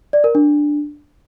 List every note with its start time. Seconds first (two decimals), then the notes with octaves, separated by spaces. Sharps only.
0.13 D5
0.24 A#4
0.35 D4